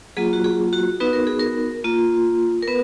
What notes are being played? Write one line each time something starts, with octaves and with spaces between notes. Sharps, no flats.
F#3 A#3 F4 G#4
F#4
G#4
F#4
B3 D#4 F#4 B4
A#4
G#4
A#4
A#3 F4
A#4
B3 B4